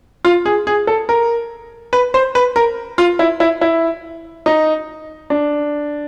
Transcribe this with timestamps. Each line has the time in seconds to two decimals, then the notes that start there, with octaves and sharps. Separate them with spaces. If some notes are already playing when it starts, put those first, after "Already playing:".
0.25 F4
0.46 G#4
0.67 G#4
0.87 A4
1.09 A#4
1.93 B4
2.14 C5
2.35 B4
2.56 A#4
2.98 F4
3.19 E4
3.40 E4
3.61 E4
4.46 D#4
5.30 D4